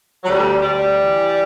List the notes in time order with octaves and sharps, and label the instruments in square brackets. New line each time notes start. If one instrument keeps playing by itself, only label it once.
[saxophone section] F#3
D2 G3
D2 G3
E3